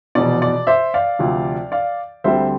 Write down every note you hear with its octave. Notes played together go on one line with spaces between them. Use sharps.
F1 E2 B2 D5
D5
C5 E5
D5 F5
D2 C3 F3
D5 F5
D2 D3 G3 C4 C5 E5